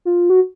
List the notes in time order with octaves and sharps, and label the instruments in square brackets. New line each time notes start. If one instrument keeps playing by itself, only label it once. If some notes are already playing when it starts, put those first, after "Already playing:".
[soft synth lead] F4
F#4